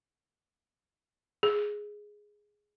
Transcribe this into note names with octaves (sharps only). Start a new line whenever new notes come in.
G#4